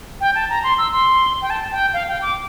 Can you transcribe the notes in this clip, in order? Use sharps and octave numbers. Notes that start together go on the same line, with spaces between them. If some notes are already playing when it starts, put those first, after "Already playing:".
G5
A5
A#5
C6
E6
C6
G5
A5
G5
F5
G5
D6